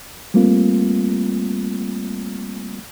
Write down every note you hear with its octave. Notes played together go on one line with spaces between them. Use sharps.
G3 A3 A#3 C4 F4